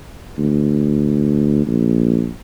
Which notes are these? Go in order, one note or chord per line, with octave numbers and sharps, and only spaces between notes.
D2
A#1